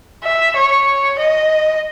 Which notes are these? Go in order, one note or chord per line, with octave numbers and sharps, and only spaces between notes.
E5
C#5
D#5